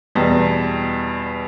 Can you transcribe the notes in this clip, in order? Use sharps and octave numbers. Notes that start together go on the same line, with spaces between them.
E2 B2 G3